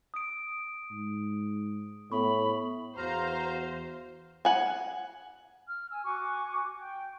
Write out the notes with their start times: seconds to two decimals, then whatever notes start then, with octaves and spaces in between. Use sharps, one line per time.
0.14 D#6 D7
0.91 G#2
2.12 A2 B3 B5 C#6
2.97 E2 F#4 C5 F5 A#5
4.45 F#5 G#5
5.67 F6
5.90 G#5 E6
6.04 F#4 G#5 C#6 D6
6.79 G5